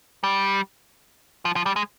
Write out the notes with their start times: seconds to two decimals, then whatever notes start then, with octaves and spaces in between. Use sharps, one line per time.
0.24 G3
1.45 F3
1.56 F3
1.66 G3
1.76 G#3